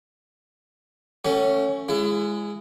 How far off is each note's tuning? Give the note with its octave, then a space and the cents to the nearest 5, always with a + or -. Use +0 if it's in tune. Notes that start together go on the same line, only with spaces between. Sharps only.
A3 +25 C#4 +0 F#4 +40
G#3 -5 E4 +35